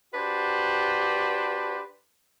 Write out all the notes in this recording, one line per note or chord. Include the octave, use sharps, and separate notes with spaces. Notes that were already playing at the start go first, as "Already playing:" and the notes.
D4 F#4 G4 B4 C5 D5